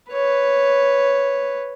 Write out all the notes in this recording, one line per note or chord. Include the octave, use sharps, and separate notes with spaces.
B4 C#5